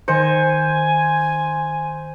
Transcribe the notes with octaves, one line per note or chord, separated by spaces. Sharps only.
D#3 C5 D#5 G#5 C#7